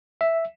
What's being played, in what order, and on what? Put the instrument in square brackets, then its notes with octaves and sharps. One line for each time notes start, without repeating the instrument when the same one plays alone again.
[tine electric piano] E5